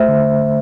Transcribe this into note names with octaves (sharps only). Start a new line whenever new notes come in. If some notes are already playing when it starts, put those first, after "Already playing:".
Already playing: A3 C5 E5
D3